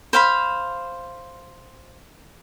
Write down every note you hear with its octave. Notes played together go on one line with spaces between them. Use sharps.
C5 F5 B5